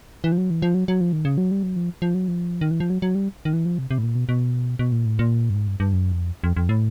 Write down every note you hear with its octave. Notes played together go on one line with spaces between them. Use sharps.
E3
F3
F#3
E3
F3
F#3
F#3
F3
D#3
C#3
F#3
G3
F#3
F3
F3
F#3
F3
D#3
E3
F3
F#3
F#3
G3
D#3
E3
F3
C3
C3
A2
A#2
B2
B2
B2
A#2
A2
A#2
G2
G#2
G2
G2
F#2
F2
F2
F2
A2